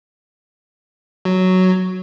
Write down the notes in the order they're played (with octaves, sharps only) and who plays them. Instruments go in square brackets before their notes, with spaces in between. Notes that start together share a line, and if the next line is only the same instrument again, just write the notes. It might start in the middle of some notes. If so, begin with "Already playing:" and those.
[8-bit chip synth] F#3